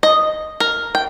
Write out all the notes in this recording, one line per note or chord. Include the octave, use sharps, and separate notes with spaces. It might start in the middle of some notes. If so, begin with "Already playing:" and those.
D#5
A#4
G5